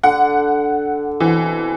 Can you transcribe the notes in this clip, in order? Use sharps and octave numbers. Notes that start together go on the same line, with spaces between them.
D3 A4 F#5
B2 E3 C4